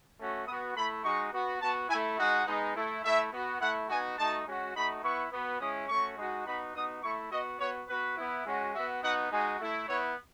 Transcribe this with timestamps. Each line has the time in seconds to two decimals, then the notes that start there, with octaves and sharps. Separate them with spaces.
0.18 A3 C#4 F#4
0.47 B3 D#6
0.51 F#4
0.76 A3 E4 B5
1.04 G#3 D#4 F#4 C#6
1.33 B3 F#4
1.61 B3 F#4 A5
1.89 E4 G#5
1.94 A3
2.18 G#3 D#4 F#4 F#5
2.47 G#3 B3 D#4
2.75 A3 E4
3.04 A3 E4 E5
3.32 B3 F#4
3.60 A3 E4 F#5
3.89 B3 D#4 F#4 G#5
4.18 A3 D#4 F#4 A5
4.46 G#3 C#4 F#4
4.75 A3 D#4 F#4 B5
5.03 B3 E4 C#6
5.32 B3 F#4
5.60 G#3 C#4 E4 D#6
5.89 A3 C#4 F#4 C#6
6.17 G#3 D#4 F#4
6.46 B3 D#4 F#4 B5
6.74 B3 D#4 F#4 D#6
7.03 A3 E4 C#6
7.31 B3 F#4 D#5
7.60 B3 F#4 C#5
7.88 B3 F#4 B4
8.17 B3 E4
8.46 G#3 C#4 F#4
8.74 B3 F#4 E5
9.03 B3 D#4 F#4 F#5
9.31 G#3 D#4 F#4 G#5
9.60 A3 E4
9.88 B3 E4 C#5